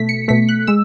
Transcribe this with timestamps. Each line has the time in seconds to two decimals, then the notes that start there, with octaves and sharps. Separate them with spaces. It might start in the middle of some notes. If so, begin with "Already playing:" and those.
Already playing: B2 A3 B6
0.09 C#7
0.28 B2 A3 B6
0.49 F#6
0.67 G#3 E6